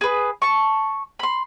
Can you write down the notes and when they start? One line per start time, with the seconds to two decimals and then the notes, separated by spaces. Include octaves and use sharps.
0.01 G#4 B4
0.42 A5 C#6
1.19 B5 C6